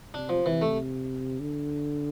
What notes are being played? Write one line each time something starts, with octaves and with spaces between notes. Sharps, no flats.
C3 D4
F3
C3 E3
A3
D3